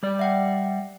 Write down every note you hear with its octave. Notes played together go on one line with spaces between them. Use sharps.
G3 D5
E5 F#5 G5